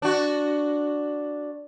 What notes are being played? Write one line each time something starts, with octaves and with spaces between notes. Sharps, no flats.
D4 F#4